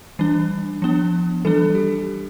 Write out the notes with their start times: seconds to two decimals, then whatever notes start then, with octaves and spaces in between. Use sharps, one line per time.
0.19 E3 G3 D4
0.82 F3 B3 D4
1.45 E3 G3 D4 A4
1.75 G4